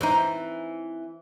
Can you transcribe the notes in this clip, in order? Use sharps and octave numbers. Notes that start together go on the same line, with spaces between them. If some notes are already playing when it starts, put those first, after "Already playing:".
E3 C4 D#4